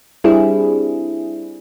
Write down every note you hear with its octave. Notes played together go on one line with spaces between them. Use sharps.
G3 C4 D4 E4 G#4